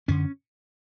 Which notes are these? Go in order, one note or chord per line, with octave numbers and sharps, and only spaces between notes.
F#2 D3 C#4